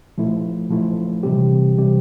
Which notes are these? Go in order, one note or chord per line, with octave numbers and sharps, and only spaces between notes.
A#2 F3 A3 E4
A#2 F3 A3 E4
C3 E3 G3 C4 G4
C3 E3 G3 C4 G4